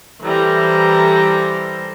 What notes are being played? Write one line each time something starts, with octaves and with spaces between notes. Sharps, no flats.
E3 G3 A4 C5 A#5